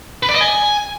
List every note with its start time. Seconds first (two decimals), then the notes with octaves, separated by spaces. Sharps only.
0.23 B4
0.29 D5
0.35 D#5
0.41 G#5